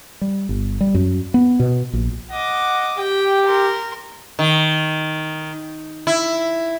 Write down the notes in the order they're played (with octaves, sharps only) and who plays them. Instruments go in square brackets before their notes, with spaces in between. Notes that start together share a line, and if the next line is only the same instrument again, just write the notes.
[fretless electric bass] G3
G1
G3
F#2
B3
B2
A#1
[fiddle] D#5 D6 [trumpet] F#5
[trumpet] G4 [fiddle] G5
[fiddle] A#4 C6
[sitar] D#3
E4